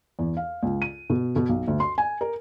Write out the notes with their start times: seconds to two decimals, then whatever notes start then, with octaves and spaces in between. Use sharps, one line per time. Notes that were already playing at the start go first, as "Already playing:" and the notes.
0.19 E2
0.37 F5
0.63 C#2
0.82 D#7
1.10 B2
1.36 B2
1.49 B1
1.68 D2
1.80 C6
1.98 G#5
2.21 A#4